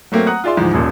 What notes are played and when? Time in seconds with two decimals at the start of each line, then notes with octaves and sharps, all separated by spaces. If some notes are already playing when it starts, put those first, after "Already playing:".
0.12 F#3 A3 A#3 C4
0.27 F#5 A#5 D#6 F#6
0.44 F4 G#4 D5 E5 C6
0.57 D2 G#2 E3 F3
0.74 D#1 A1 A#2